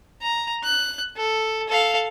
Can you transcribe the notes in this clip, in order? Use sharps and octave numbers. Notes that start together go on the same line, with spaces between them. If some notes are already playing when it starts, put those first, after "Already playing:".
A#5
F#6
A4
A4 F5